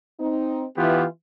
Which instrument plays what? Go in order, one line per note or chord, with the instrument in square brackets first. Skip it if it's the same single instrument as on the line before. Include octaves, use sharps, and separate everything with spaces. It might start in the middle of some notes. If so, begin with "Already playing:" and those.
[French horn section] C4 D#4
[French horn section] E3 [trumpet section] B3 F4 G4